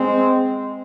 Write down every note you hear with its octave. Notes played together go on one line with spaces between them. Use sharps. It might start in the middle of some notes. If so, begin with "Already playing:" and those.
Already playing: G#3 C4